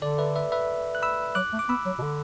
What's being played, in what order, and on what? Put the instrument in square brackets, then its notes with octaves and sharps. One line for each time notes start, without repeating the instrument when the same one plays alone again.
[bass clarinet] D3 [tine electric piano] A4 D5
[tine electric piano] B4 E5
B4 E5
B4 E5
F#6
B5 E6
[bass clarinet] F#3 [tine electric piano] D6 F#6
[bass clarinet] A3
[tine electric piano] D6
[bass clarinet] B3 [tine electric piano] B5 E6
[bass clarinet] F#3
B2
D3